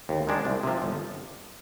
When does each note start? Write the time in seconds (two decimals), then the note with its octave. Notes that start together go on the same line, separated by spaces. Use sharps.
0.09 D#2
0.27 D#3 G#3 D4
0.45 C2
0.63 C3 F3
0.82 G1